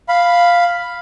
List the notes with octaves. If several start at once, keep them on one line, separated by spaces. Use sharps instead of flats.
F5 B5